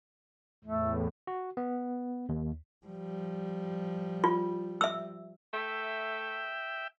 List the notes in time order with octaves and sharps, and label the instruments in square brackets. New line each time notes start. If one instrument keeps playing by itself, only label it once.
[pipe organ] E2 A2 [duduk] A3
[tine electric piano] F#4
B3
D#2
[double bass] F3 G3
[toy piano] F4
E5 E6
[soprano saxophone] A3 [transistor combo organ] E5 G5